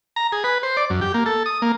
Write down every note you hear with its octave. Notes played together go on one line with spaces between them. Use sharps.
A#5
G#4
B4
C5
D5
F#2
G4
A#3
A4
D#6
A#3